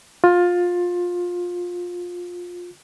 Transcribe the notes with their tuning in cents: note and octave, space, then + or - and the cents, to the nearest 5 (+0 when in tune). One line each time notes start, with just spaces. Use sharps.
F4 +20